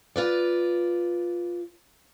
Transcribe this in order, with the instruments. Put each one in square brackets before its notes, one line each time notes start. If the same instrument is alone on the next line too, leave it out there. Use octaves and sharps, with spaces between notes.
[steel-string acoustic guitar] F4 B4 D5